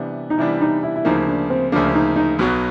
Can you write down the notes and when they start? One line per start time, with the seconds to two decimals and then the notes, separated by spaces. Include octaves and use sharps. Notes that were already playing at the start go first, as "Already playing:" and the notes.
Already playing: C3 E3 G3 B3 D4
0.30 D#4
0.38 C3 E3 G3 B3 D4 E4
0.61 D#4
0.83 E4
0.96 E4
1.05 D2 C#3 F3 A#3 D#4
1.27 D4
1.50 C4
1.72 D2 C#3 F3 A#3 D4
1.95 D#4
2.16 D#4
2.39 B1 B2 F#3 B3